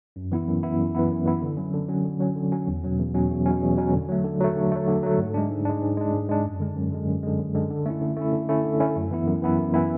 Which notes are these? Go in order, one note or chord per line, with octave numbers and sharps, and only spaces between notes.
F#2
E3 B3 E4
F#2
E3 B3 E4
F#2
E3 B3 E4
F#2
E3 B3 E4
D3
F#3 C#4
D3
F#3 C#4
D3
F#3 C#4
D3
F#3 C#4
E2
B2 F#3 C#4
E2
B2 F#3 C#4
E2
B2 F#3 C#4
E2
B2 F#3 C#4
D3
F#3 A3
D3
F#3 A3
D3
F#3 A3
D3
F#3 A3
G#2
G#3 D4
G#2
G#3 D4
G#2
G#3 D4
G#2
G#3 D4
F#2
D3 G#3
F#2
D3 G#3
F#2
D3 G#3
F#2
D3 G#3
D3
A3 C#4 E4
D3
A3 C#4 E4
D3
A3 C#4 E4
D3
A3 C#4 E4
F#2
E3 B3 E4
F#2
E3 B3 E4
F#2
E3 B3 E4